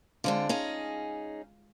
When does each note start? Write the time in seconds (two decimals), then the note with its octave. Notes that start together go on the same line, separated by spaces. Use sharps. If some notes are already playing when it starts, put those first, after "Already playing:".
0.24 D3 G#3 C4 D4 F4
0.49 C#4 D#4 F4 G#4